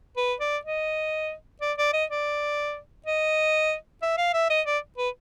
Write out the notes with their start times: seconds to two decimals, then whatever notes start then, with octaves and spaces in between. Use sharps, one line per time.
0.17 B4
0.40 D5
0.65 D#5
1.61 D5
1.78 D5
1.93 D#5
2.10 D5
3.06 D#5
4.02 E5
4.18 F5
4.34 E5
4.50 D#5
4.66 D5
4.98 B4